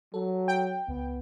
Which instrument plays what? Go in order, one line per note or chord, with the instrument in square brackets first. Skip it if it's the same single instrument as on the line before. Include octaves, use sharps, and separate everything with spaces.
[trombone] F#3 [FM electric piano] A4
[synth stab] G5
[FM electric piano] C#2 [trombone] B3